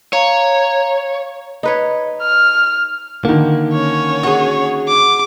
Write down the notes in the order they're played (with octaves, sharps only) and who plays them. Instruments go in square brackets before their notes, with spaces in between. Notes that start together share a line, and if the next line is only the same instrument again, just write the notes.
[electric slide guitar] C#5 [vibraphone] F5 A#5
[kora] D#4 B4 C#5
[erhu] F6
[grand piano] D3 D#3 [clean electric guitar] A#3
[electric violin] C#4 C#5
[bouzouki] F#4 G#4
[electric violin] D6